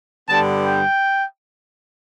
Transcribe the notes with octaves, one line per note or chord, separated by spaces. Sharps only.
G2 D3 G3 B3 A5
G5